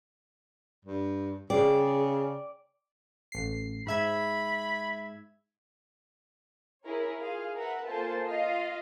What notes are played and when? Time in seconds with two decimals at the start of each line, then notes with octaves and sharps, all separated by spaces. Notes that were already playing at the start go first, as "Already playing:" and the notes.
0.85 G2
1.50 C#3 G#4 D5 G5
3.32 A1 C7
3.87 G#2 E5 B5 G#6
6.84 E4 G#4 A#4 C#5
7.19 F4 G#4 F5
7.54 A#4 B4 E5 F#5
7.87 A#3 F4 A4 C5 G#5 A5
8.24 F4 D#5 F5